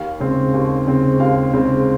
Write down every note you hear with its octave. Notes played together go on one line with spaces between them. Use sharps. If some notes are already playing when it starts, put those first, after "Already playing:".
Already playing: D#2 F5
C#3 G#3 C4
D#2
C#3 G#3 C4
D#2 F5
C#3 G#3 C4